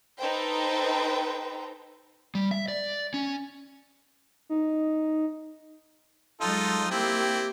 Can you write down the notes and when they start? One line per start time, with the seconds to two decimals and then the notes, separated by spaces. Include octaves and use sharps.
0.19 D#4 A4 B4 C5 G5
2.35 G3
2.51 E5
2.68 D5
3.14 C#4
4.49 D#4
6.41 F#3 G#3 D#4 F4 A4
6.91 A#3 C4 E4 G4